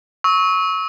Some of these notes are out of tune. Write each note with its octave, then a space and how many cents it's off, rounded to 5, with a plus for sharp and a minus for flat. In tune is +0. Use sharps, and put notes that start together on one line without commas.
C#6 +0 E6 -35